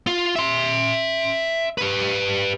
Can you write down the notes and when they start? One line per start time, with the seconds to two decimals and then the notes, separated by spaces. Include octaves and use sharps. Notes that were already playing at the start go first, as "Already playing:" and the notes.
0.07 F4
0.36 E5 C6
1.78 G4 B4